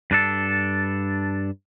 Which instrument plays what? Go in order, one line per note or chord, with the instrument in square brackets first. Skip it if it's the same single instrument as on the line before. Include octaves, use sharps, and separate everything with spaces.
[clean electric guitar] G2 D4 A4